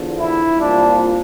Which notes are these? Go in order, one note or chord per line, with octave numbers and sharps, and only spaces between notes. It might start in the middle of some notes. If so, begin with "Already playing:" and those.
Already playing: E2 D3 F3
E4
C2 A#2 F3 D4